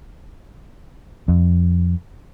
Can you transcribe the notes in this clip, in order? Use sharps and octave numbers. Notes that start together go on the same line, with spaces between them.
F2